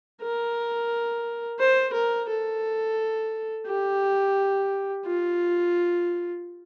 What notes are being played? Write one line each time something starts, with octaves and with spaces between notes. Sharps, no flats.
A#4
C5
A#4
A4
G4
F4